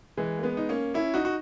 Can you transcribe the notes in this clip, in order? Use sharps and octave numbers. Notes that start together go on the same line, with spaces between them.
E3 G#3
A#3
G#3 B3
D#4
A#3 C#4
C#4 E4
D#4 F#4
F#4